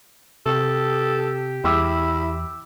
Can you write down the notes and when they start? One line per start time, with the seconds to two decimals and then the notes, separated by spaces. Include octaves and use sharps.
0.46 C3 G4 A4
1.64 E2 E4 G5 D6 E6